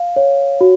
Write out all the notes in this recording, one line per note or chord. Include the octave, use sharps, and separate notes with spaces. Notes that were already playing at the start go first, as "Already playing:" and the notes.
Already playing: F5
C#5
F#4